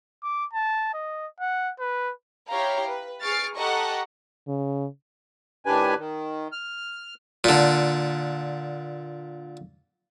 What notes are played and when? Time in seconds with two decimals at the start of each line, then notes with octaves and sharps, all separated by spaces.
0.23 D6
0.53 A5
0.94 D#5
1.40 F#5
1.80 B4
2.49 E4 G4 C#5 F5 G5 A#5
2.87 B4
3.23 G#4 C#6 F6 A6 C7 D7
3.57 G4 A4 D#5 F#5 A#5 C#6
4.48 C#3
5.65 A2 D#3 D4 G4 B4 G#5
5.98 D#3
6.52 F6
7.44 A#2 D3